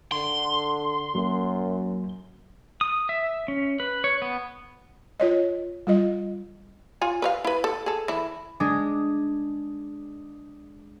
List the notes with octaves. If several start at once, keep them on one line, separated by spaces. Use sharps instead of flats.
D3 C6
F#2 F#3 A#3
D#6
E5
C#4
B4
C#5
B3
F4 C#5 D#5
G3 F4 D#5
F4 C#5 G#5
B4 C#5 F5
E4 B4
A4
G#4 A4
E3 E4
G#3 D4 G#4